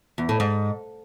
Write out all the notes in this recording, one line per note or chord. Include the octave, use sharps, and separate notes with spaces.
E2
A2
G#2